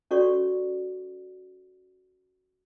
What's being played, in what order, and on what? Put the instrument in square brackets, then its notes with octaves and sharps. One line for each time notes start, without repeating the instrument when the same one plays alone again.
[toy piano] C#4 F#4 A4 C#5 D5 C#6